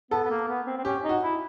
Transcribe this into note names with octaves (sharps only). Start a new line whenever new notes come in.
B3 A4
B3
A#3
B3
C4
C4
C#4 G4
D#4
F#4
E4